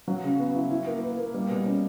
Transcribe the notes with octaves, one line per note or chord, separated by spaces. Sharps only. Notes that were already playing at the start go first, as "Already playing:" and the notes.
F#3
C#3
B3
E4
E4
A#3
B4
A#3
G3
B2
C#4